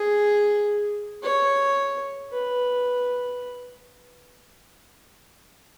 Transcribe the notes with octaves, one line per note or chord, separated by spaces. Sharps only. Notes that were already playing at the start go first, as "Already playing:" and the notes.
Already playing: G#4
C#5
B4